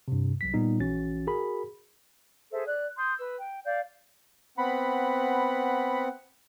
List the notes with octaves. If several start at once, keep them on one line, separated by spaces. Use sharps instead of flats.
G2 C3
C2 F#3 B6
A#2 G3 B3 D#4
A#1 E3 C#4 F#4 A6
F#4 G#4 A#4 B5
G#4 A4 C5 E5
D5 F#6
C6 D#6 G6
B4 E6
G5
D5 F5 G6
B3 C4 F#5 B5